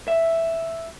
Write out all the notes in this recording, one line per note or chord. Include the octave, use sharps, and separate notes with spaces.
E5